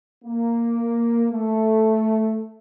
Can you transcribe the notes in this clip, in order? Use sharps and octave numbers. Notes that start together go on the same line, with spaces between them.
A#3
A3